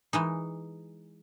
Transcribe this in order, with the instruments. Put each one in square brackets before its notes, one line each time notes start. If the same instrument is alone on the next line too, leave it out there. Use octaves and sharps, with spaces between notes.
[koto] E3 G#3 D#4